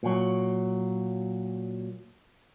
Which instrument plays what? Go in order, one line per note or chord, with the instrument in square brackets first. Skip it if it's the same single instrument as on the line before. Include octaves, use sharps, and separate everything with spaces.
[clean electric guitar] A#2 F#3